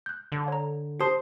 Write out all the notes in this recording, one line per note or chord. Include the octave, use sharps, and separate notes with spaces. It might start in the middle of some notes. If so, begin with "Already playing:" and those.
F#6 G6
D3
C#5 A#5
G4 C5 A5 D#6